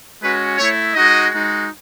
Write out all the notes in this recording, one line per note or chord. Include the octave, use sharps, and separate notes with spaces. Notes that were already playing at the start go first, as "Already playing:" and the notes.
G#3 C#4 F#4 B4
A3 E4 C#5
G#3 D#4 F#4 D#5
G#3 D#4 F#4